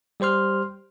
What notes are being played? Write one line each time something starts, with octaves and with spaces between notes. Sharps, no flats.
G3 G4 C5 C6 F6